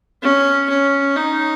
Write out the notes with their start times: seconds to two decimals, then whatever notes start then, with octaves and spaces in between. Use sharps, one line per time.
0.23 C#4
0.70 C#4
1.16 D#4